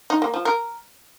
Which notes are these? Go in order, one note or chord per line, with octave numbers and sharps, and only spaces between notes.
D#4
A#3
F3
A#4